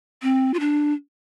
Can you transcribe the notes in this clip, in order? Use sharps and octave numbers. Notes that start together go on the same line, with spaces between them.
C4
F4
D4